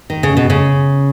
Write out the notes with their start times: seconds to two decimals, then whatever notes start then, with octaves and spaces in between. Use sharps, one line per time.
0.10 D#3
0.23 C#3
0.37 B2
0.50 C#3